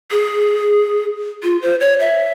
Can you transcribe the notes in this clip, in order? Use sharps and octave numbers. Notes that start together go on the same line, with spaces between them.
G#4
F4
C5
C#5
E5